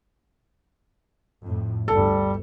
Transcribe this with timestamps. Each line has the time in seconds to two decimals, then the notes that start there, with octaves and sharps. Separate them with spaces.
1.44 F2 A2
1.88 G1 D2 G3 A4